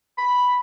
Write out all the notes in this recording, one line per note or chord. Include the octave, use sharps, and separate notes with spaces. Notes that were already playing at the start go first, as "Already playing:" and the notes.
B5